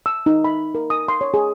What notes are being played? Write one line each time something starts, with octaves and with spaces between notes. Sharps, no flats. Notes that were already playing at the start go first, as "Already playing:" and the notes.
E6
D#4
B5
A#4
D#6
C6
C#5
G#4